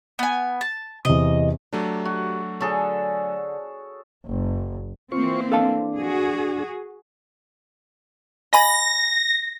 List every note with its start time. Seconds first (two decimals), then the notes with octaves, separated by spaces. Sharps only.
0.19 B3 G#5
0.61 A5
1.05 E2 C3 D#5
1.73 F#3 A3 D4 G4 A#4
2.05 F#4
2.61 D3 G#4 A4 C#5
4.27 F#1
5.12 E3 A#3 C4 F4 C5 C#6
5.52 D4 A4 F5 A5
5.96 F#4 G#4
8.53 D#5 G#5 B5 A#6